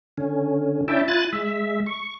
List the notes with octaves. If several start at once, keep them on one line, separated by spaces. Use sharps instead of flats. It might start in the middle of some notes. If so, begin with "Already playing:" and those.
D3 C#4
C#4 D4 E4 E5 G5 A5
E4 F4 G#5 F#6 A6
G#3 E5
C#6